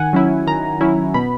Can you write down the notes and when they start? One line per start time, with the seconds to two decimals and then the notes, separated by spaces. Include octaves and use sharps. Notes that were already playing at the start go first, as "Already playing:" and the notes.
Already playing: D#3 F#5 G#5
0.13 F#3 C#4 E4
0.47 D#3 A#5
0.81 F#3 C#4 E4
1.14 B2 B5